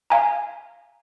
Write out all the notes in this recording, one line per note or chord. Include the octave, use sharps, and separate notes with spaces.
F5 G#5 A#5